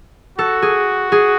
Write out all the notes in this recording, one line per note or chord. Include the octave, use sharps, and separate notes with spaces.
F#4 A4
G#4
G#4